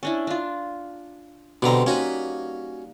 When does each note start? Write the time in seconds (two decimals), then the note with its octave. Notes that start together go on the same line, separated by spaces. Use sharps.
0.03 C#4 D4 E4
0.27 D4 F4
1.62 B2 D3 G3 C4 A#5
1.86 A#3 C#4 D#4 F#4 B4